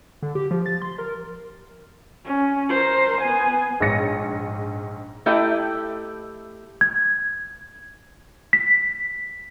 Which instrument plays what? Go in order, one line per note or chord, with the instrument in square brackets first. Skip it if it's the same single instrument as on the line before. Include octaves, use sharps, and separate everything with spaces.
[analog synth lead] D3
G4
F3
A6
C6
A#4
[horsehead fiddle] C#4
A#4 C5
B3 G#5
[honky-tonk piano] A#1 G#2 C#5 A#6 C#7
[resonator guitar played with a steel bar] A3 E4 G4 D#5
[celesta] G#6
B6